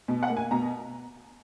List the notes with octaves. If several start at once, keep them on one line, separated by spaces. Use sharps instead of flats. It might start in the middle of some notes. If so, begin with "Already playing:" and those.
B2
F#5
A#3
G#5
B2 A#5